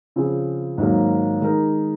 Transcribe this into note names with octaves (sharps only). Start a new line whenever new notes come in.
C#3 F3 C4 F4 G#4
G#2 D#3 F#3 A#3
D#3 G#3 D#4 A#4